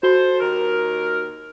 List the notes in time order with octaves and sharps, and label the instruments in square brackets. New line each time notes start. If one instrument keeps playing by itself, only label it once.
[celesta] F#4 [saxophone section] A4 C5
[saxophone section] D#2 D#3 A#4